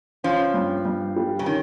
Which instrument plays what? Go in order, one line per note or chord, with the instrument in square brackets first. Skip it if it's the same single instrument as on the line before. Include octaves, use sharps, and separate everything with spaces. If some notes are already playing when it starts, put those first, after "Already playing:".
[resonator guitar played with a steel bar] F3 [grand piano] C#4
[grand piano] G2
G2
G3
[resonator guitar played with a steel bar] C#3
[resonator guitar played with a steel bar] D#3 [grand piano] C#4